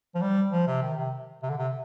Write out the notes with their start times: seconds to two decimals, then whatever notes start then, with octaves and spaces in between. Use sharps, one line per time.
0.15 F3
0.22 G3
0.52 F3
0.67 C3
0.83 D#3
0.98 C3
1.43 C3
1.50 D3
1.58 C3